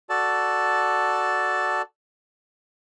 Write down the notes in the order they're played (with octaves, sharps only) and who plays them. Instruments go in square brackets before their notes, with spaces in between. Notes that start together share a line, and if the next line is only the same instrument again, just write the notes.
[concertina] F#4 A4 D5 A5